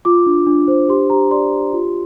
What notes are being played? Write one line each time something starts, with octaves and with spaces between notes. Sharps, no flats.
F4 D6
D4
D4
C5
G4 C6
G4 A#5
D5 C6
G4
F4